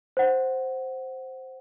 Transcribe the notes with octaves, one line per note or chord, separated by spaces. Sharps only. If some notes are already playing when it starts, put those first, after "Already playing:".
C5 F#5